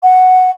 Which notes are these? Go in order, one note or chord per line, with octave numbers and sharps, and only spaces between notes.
F#5